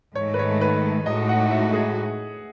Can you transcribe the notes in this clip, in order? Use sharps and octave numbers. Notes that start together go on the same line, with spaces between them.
G#2 D#3 A3 C#5
B4
C#5
B4
A2 G#3 D#4 F#4 D#5
F#5
E5
G#4